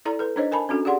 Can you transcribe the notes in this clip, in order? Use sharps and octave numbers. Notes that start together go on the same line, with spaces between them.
E4 A4 D5 A#5
A4 B4
D4 D#4 C5 C#5 D#5
A#4 G#5 A5 B5
C#4 D4 F#4 A4
G4 G#4 D5 F#5 C6